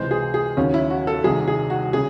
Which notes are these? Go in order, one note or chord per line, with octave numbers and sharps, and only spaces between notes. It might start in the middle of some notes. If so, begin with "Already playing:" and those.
Already playing: C#2 C3 E3 G#3 C5
G#4
G#4
D#2 C#3 F#3 C#4
E4
F#4
A4
C2 C3 D#3 G#4
G#4
F#4
C#3 G#4